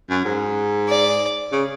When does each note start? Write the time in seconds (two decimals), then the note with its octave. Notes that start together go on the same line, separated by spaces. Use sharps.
0.10 F#2
0.25 G#2
0.89 D5
1.52 C#3